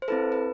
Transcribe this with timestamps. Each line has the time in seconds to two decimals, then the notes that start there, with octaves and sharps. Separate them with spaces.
0.02 C5
0.08 C4 E4 A4 B4
0.32 B4